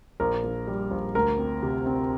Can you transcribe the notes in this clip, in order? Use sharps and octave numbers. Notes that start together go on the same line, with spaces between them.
A#1 A#4
A#1
G3
A#1
D2 A#4
C4
C3
C4